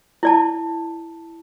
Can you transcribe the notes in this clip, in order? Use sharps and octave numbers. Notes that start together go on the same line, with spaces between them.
E4 D5 A5